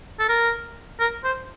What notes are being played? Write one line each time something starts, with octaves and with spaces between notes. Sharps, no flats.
A4
A#4
A#4
C5